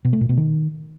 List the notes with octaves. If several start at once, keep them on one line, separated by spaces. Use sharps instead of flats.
B2
A3
A#2
B2
D#3